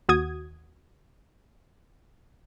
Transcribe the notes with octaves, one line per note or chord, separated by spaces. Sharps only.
D#2 F#4 D#6 G#6